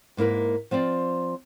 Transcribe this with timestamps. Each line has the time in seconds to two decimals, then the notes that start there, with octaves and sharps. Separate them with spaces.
0.17 G#2 A#3 E4 A#4 B4
0.71 F3 C4 F4 D5